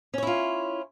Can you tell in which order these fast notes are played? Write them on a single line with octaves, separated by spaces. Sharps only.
C#4 C#5 E4 F4